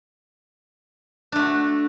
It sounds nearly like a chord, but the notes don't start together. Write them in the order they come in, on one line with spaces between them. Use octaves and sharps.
D4 A3 F#4